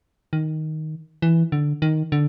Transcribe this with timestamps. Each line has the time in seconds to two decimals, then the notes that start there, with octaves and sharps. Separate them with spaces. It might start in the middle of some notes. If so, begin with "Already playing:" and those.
0.33 D#3
1.22 E3
1.52 D3
1.82 D#3
2.12 D3